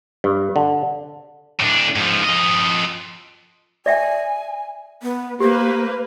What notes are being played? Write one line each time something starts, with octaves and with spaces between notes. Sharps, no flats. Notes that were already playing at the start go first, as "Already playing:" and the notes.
G2
D3
A2 D4
G#2 F3
F3 D#5
D5 E5 G5 G#5
B3
A#3 G4 B4 C5